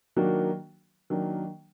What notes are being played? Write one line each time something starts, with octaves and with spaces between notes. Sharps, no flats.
D#3 F#3 A#3 D4 F#4
D#3 F#3 A#3 D4